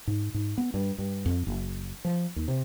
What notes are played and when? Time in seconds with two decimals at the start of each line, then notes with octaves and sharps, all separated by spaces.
0.07 G#2
0.34 G#2
0.58 B3
0.74 G2
0.98 G2
1.26 F2
1.47 F#1
2.05 F3
2.36 D#2
2.48 C3